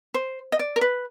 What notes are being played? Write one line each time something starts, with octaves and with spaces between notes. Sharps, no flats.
C5
D#5
D5
A#4
B4